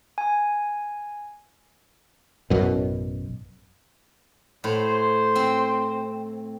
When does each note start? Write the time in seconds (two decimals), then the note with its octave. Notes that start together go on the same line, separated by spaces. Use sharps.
0.18 G#5
2.50 A1 F#2 B2
4.64 A2 C5
5.36 C4